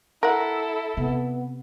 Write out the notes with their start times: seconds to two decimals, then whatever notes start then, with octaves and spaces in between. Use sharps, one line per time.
0.23 E4 A4 A#4 F#5
0.97 C3 B3